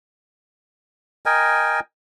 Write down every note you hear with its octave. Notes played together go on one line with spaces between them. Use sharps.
A#4 D#5 G5 G#5